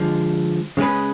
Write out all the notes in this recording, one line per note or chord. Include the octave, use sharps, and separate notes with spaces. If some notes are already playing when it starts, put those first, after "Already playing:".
Already playing: D3 F3 G#3
C#3 G#3 C#4 G#4 B4